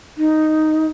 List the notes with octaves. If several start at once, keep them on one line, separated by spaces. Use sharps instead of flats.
D#4